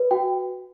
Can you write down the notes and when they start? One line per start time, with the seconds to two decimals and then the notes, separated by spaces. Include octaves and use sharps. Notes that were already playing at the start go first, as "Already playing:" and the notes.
Already playing: B4
0.11 F#4 G5